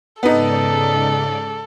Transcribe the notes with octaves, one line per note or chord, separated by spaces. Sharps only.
G#2 C#3 B3 D#4 A4 D5